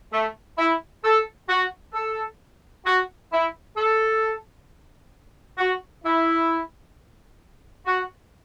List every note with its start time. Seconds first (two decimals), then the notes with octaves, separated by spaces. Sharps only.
0.13 A3
0.58 E4
1.04 A4
1.49 F#4
1.94 A4
2.86 F#4
3.32 E4
3.76 A4
5.58 F#4
6.04 E4
7.86 F#4